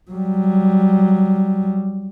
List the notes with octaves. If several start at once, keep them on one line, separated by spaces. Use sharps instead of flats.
F#3 G3